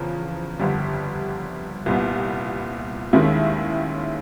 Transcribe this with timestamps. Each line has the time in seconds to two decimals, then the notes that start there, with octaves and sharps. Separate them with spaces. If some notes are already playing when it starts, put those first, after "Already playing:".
Already playing: E2 C#3 F3
0.59 G1 F2 D3 G3
1.86 C2 A#2 G3 B3
3.13 D#2 D#3 G#3 C#4 E4